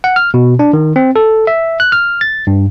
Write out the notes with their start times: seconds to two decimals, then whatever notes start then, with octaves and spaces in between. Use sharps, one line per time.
0.04 F#5
0.16 F6
0.34 B2
0.59 D4
0.73 D#3
0.96 C4
1.16 A4
1.47 E5
1.80 F#6
1.92 F6
2.21 A6
2.47 G2